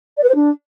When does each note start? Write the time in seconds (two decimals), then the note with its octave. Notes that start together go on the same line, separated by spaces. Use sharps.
0.17 D5
0.23 B4
0.29 C5
0.34 D4